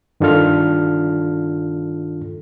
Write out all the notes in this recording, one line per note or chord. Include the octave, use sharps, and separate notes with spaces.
G2 D#3 D4 F4 A4 F6